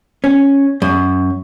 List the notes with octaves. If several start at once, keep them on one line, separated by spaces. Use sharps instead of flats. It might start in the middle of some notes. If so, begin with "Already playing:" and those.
C#4
F#2